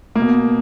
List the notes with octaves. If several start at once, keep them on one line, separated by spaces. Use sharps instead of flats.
B2 A#3